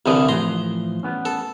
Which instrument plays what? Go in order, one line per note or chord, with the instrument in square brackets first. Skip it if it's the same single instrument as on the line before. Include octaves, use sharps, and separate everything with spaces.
[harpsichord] C2 D3 E3 [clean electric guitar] G#4 D#5
[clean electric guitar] A2 E3 F3 [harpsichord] A#5 C6
[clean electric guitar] G3 B3 C#4
[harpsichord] A4